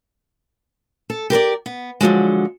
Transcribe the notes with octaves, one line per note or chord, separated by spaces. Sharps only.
A4
G4 A#4 B4 D5
B3
D3 F3 F#3 G#3